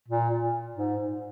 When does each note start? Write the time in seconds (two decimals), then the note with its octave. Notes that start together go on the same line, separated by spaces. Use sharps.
0.08 A#2
0.75 G#2